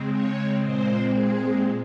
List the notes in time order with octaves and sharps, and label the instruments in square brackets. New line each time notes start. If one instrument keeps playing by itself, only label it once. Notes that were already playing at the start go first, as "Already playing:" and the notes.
Already playing: [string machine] C#3 G#3 C4
C#5
A#2 G#3 C4 C5
G#4